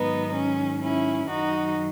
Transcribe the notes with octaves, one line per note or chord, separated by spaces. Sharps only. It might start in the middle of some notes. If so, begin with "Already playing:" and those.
Already playing: G#2 D#3 F#3 B3 D#4
C#4
C#4 E4
F#2 D#3 F#3 D#4 F#4